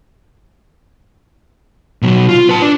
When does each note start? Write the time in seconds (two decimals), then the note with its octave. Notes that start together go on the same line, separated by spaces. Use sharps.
2.02 B2 F#3
2.29 F4
2.49 B4 A5
2.62 D4